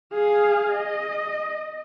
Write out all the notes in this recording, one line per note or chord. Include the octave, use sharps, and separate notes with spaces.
G#4 F5
D#5